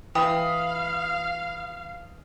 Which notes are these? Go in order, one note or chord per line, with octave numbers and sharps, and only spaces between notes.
E3 F5 G5 B5 D#6